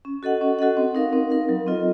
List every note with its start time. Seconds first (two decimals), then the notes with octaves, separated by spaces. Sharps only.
0.05 C#4
0.23 F#4 A4 D#5 F#5
0.41 C#4
0.59 F#4 A4 D#5 F#5
0.77 C4
0.95 D#4 A#4 F5
1.13 C4
1.30 D#4 A#4 F5
1.49 F#3
1.67 C4 F4 A4 D#5